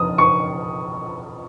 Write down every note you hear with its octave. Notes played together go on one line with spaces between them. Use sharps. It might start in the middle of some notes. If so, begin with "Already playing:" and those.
Already playing: F2 D#6
C#6